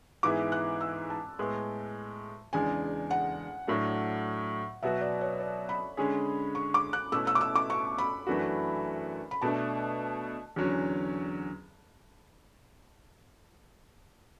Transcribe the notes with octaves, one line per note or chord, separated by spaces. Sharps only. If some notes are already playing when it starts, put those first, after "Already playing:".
G#2 E3 B3 E4 G#4 D6
F#6
E6
A5
A2 G#3 B3
E2 C#3 G#3 D4 G#5
F#5
A2 F#3 A3 D4 F#4
B2 F#3 B3 F#4 E5
D5
C#5
D5
B5
D3 G#3 C#4 G#4
C#6
D6
F#6
B2 A3 C#4 E4 E6
E6
D6
E6
D6
C#6
B5
F#2 E3 A3 D4 F#4
B5
B2 A3 D4 A5
E2 D3 F#3 C#4